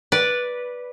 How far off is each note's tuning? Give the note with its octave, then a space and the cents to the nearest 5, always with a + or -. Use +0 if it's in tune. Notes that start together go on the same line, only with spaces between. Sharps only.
B4 -10 D5 +0